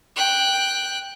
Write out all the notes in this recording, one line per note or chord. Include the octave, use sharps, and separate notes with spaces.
G5 F#6